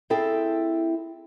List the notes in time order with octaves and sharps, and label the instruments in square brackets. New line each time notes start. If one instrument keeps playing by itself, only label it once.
[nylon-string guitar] C4 E4 G#4 A4 G5